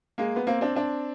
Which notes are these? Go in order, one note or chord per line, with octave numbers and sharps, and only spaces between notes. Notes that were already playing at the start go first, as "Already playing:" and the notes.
G#3 A#3
B3
A#3 C4
C4 D4
C4 D4